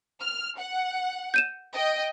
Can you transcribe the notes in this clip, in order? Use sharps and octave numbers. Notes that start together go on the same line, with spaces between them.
F6
F#5
G6 D#7 E7
D#5 G5